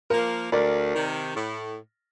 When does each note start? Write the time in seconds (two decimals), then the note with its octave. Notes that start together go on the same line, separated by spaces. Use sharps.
0.10 F3 A#3 A#4
0.52 D2 A#4 D5
0.95 C3 D#3
1.36 A2